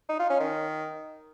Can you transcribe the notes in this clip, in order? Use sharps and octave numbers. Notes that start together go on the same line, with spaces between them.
D#4
F4
C#4
D#3